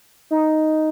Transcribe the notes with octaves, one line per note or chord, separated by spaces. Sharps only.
D#4